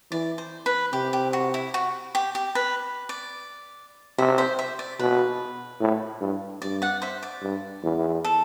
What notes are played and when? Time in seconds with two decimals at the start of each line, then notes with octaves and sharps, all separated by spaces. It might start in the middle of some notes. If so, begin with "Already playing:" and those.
0.11 E3 D5
0.38 C5
0.66 B4
0.93 C3 G4
1.13 G4
1.33 F#4
1.54 E4
1.74 F#4
2.15 G4
2.35 G4
2.55 B4
3.09 D5
4.18 C3 C5 E5
4.38 C5 E5
4.59 C5 E5
4.79 D5
4.99 B2 B4
5.81 A2
6.21 G2
6.62 G2 D5
6.82 D5 F#5
7.02 C5 E5
7.23 D5
7.42 G2
7.83 E2
8.25 A4